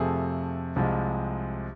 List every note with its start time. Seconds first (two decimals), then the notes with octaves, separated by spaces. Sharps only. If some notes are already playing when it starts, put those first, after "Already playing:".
Already playing: F2 C3 F3 A3 G#4
0.76 C2 C3 F3 G#3